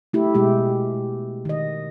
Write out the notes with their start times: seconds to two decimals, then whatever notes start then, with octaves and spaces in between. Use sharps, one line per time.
0.13 A3 E4 G4
0.35 B2 G#3 G4
1.45 D#3 D#5